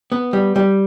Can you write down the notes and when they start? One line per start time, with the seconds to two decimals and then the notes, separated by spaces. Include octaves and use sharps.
0.12 B3
0.33 G3
0.56 G3